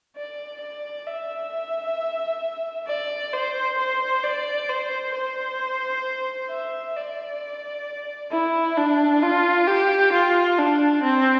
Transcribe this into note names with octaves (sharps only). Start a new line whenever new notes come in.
D5
D5
E5
D5
C5
C5
D5
C5
C5
E5
D5
E4
D4
F4
G4
F4
D4
C4